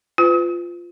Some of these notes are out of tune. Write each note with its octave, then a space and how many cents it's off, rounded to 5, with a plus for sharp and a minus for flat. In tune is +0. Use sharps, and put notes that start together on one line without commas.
F4 -5 B4 +35